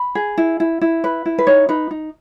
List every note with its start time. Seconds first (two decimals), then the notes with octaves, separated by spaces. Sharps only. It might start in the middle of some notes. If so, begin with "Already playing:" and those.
Already playing: B5
0.15 G#4
0.38 E4
0.60 E4
0.81 E4
1.04 B4
1.26 E4
1.38 B4
1.47 D#4 C#5
1.69 D#4 B4
1.91 D#4